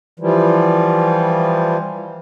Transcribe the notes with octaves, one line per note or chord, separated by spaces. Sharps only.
E3 F3 G3